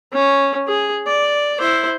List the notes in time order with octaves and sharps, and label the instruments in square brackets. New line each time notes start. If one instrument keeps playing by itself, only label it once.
[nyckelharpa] C#4
G#4
D5
E4 C5